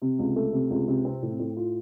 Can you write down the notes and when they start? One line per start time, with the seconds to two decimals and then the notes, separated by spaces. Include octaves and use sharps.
0.02 C3
0.19 C#2
0.36 A3
0.53 C3
0.70 C#2
0.88 C3
1.05 C4
1.22 A2
1.39 A2
1.57 F4